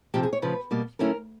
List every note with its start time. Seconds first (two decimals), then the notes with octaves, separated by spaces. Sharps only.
0.14 F2 C3 F3 G4
0.23 G#4
0.33 C#5
0.42 D2 C#3 F3 B4
0.71 B2 G3 A#3
0.99 D3 F#3 A3 C#4 E4 A#4